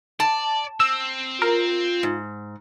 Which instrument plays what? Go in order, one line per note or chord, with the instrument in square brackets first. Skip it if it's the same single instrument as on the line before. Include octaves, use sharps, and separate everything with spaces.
[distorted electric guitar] D5 [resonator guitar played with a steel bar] A5
[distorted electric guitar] C4 [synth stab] E6
[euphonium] F4 [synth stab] A#4
[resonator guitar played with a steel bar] G#2